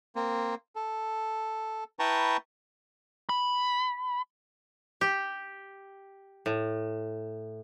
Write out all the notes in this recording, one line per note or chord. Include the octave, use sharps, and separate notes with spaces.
A#3 C4
A4
E4 B4 G5 A5 A#5 C#6
B5
G4
A2